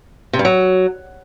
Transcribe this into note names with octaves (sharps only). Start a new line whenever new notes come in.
C3
G2
F#3